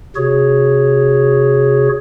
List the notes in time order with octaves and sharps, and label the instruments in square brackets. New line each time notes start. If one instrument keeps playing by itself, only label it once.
[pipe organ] C3 F#4 G#4 C#5